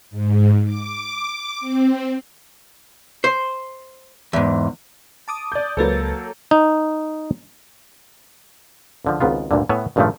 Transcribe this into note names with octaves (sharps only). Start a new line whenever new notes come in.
G#2
D6
C4
C5
E2 G#2
A5 D6 D#6
D5 G6
C#2 F#3 A#3 A4 B4 A6
D#4
C#2 D3 F3
G#1 C#2 G#2 B3 F4
D2 G2 A#2 D3
A2 B3 C#5 E5 F#5 G#5
A1 G2 A#2 C#3 F3 A3